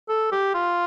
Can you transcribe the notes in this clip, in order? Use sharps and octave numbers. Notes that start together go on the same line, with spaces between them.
A4
G4
F4